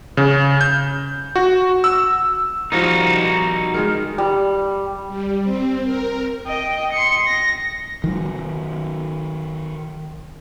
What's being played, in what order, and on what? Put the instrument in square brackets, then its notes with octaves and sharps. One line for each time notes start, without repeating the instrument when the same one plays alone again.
[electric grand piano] C#3
G6
F#4
E6
[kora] D#3 F3 G3 [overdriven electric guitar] D#4 F#4
[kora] D#3 G#3 A#4
[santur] G3
[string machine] G3
C4
A#4
[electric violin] D#5 G5
C6 C#7
A#6
[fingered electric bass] D#3 F#3